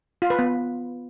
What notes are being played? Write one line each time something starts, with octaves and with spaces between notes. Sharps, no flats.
F4
B4
B3